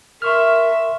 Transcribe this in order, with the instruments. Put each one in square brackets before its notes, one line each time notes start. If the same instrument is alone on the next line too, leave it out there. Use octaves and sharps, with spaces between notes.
[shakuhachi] A#4 [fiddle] E5 [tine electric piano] C6 C#6 F6